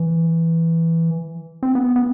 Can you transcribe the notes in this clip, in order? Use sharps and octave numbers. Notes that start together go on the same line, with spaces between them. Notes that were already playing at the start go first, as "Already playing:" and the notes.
Already playing: E3
C4
B3
B3